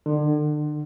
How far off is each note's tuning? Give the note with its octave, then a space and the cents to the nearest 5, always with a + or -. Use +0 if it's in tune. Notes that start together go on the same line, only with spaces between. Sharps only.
D3 +35